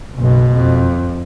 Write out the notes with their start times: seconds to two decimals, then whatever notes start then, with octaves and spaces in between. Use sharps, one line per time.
0.15 F#1 B1 B2
0.53 F2